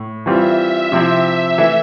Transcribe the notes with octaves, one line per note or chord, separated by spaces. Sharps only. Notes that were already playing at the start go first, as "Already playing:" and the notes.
Already playing: A2
E3 G3 C4 F4 E5
C3 F3 C4 E4
E3 A3 E4